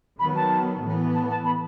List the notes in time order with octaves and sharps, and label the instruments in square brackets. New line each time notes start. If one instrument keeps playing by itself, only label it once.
[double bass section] D#3 F#3 B3 [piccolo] B5
[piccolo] A5
[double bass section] A2 E3 B3
[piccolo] A5
A5
B5